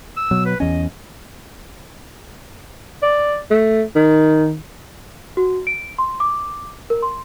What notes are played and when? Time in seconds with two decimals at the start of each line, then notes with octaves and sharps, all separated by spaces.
0.17 E6
0.31 B2 F#3
0.45 B4
0.60 E2 C#4 D#5
3.02 D5
3.51 A3
3.96 D#3
5.37 F#4
5.67 D7
5.98 C6
6.20 D6
6.90 A#4
7.02 C6